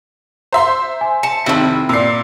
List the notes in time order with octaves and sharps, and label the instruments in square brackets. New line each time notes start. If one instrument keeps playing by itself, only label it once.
[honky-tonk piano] C5 E5 C6 [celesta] A#5
[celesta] G#5
[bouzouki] A5 [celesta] C#7
[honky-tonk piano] F1 D#3 [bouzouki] C4 E4
[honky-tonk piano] A#2 C7 [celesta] D5 E6